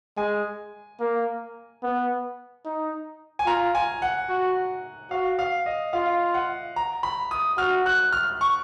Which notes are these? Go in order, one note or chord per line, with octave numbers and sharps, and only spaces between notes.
G#3 G#5
A#3
B3
D#4
G#5
F4 A#5
G#5
F#5
F#4
F#4 F5
F5
D#5
F4 F5
F#5
A#5
B5
D#6
F#4 F6
F#6
F6
C#6